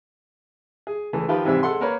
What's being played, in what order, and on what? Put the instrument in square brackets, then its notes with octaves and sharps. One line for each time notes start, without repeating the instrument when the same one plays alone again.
[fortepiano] G#4
C#2 E3 A3 G#4
D#3 F3 F4 G4 B4
G#2 C3 E3 G3 C4 E5
G#3 A4 F#5 C6
A#3 A#4 B4 C#5